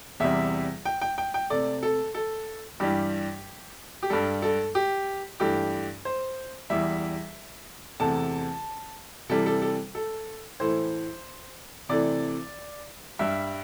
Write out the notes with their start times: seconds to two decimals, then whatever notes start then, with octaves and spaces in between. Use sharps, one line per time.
0.20 E2 C3 G3 E5
0.85 G5
1.02 G5
1.18 G5
1.34 G5
1.50 C3 A3 D5
1.83 A4
2.15 A4
2.80 G2 E3 G3 G4
4.03 G4
4.10 G2 G3 A4
4.42 A4
4.75 G4
5.40 G2 E3 A3 G4
6.05 C5
6.70 E2 E3 G3 E5
8.00 E2 C3 A3 A5
9.29 C3 E3 G3 A4
9.46 A4
9.62 A4
9.95 A4
10.60 A2 E3 A3 C5
11.89 C3 E3 A3 D5
13.19 G2 G3 E5